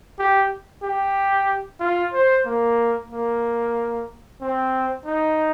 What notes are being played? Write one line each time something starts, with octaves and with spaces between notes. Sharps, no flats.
G4
G4
F4
C5
A#3
A#3
C4
D#4